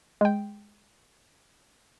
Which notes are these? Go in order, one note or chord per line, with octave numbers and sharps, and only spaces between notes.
G#3 G5